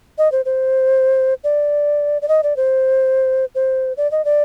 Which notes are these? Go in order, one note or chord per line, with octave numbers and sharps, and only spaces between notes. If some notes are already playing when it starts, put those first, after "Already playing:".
D#5
C5
C5
D5
D5
D#5
D5
C5
C5
D5
D#5
D5